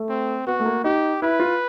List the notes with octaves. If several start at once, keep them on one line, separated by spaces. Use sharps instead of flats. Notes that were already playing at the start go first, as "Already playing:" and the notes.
Already playing: A3
C4
B3 F#4
A3
A#3
D#4 G4
E4 B4
F4